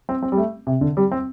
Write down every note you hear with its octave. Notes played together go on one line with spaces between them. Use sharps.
C4
C4
G3
A3
C3
D3
G3
C4